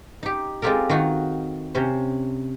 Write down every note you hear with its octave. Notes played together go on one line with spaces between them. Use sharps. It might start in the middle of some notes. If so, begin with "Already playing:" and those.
D#4 G4
G#3 C4 F4 G4 A4 A#4
D#3 D#4 F4 F#4
C3 C#4 C5